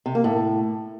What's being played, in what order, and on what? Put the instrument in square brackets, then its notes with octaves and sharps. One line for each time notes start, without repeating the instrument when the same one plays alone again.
[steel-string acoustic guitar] C3
A#3
A2